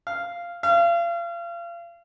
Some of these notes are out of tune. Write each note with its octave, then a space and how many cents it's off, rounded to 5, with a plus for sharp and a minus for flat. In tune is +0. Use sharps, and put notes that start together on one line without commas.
F5 -10
F5 -35